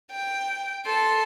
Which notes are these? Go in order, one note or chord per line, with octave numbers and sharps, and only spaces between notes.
G5
A4 C6